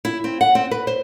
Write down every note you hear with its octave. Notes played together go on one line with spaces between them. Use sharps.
E4
C4
F#5
C4
B4
C5